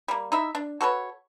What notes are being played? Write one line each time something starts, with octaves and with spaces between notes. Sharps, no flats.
G3 A#3
D#4 E4 E5
D4
F#4 A4 B4 C#5